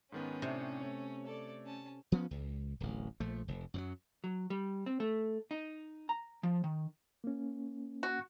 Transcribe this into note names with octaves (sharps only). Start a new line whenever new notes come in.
G#2 D#3 B3 C#4
A2 C3 D4 C5
A3 C#5
A4 D5
C#4 A5
F3 B3 C#4
C#2
D1 A1
A#1 F3 A3
F1
F#2 F3 F#3
F#3
G3
C4
A3
D#4
A#5
F3
D#3
A#3 C#4
F#4